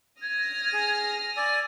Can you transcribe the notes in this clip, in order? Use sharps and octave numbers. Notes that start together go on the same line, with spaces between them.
D#6 F6 G#6 A#6
G#4
D5 G#5 E6